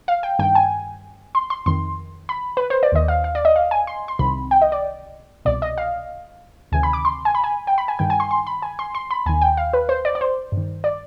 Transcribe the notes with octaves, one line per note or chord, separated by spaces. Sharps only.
F5
G5
G2 D#3 G5
G#5
C6
C6
F2 D#3 C6
B5
B4
C5
D5
D#2 D#3 D#5
F5
F5
D5
D#5
F5
G#5
C6
C6
C2 C3 D#3 B5
G5
D#5
D5
C2 B2 D5
D#5
F5
D2 C3 D#3 G#5
B5
D6
C6
G#5
B5
G#5
G5
B5
G#5
G2 D#3 G5
G#5
C6
C6
B5
G#5
C6
C6
B5
D#2 D#3 G#5
G5
F5
B4
C5
D5
D5
C5
G2 D#3
D5